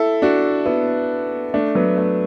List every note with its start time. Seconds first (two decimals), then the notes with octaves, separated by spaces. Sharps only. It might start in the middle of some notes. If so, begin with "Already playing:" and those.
Already playing: E4 A4
0.22 D4 F#4
0.66 B3 E4
1.54 A3 D4
1.75 F#3 B3
1.97 A3